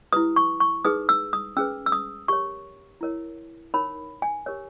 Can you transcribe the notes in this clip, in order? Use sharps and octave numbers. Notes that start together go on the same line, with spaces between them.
E4 G4 B4 D#6
C#6
C#6
D#4 G#4 B4 D#6
E6
D#6
C#4 G#4 B4 E6
E6
D#6
G4 A#4 C#5 C#6
E4 A#4 C#5
D#4 A#4 C#5 B5
G#5
G4 A#4 C#5